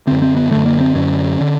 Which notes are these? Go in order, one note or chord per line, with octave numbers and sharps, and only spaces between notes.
F#2 D3 C4
C4
B3
F#2 D3 A3
A#3
C4
F#2 D3 C#4
D3